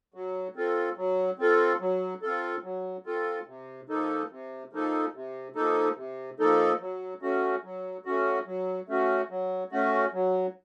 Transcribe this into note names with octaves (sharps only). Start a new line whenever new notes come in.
F#3
C4 F4 A4
F#3
C4 F4 A4
F#3
C4 F4 A4
F#3
C4 F4 A4
C3
F3 A#3 D#4 A4
C3
F3 A#3 D#4 A4
C3
F3 A#3 D#4 A4
C3
F3 A#3 D#4 A4
F#3
A3 C#4 F#4
F#3
A3 C#4 F#4
F#3
A3 C#4 F#4
F#3
A3 C#4 F#4
F#3